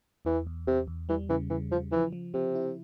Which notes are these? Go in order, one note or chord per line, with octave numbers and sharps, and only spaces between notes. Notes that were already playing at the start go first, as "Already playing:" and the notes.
E2 E3
E2
E2 C3
E2
E3 G3
C#3 E3
C#3 E3
C#3 F3
E3 F3
F3
C3 F3
E4